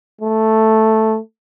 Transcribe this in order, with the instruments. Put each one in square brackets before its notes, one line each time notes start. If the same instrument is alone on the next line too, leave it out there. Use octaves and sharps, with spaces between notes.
[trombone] A3